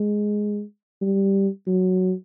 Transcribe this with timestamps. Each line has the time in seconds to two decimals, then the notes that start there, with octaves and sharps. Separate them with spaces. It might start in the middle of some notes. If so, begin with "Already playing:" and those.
Already playing: G#3
1.02 G3
1.67 F#3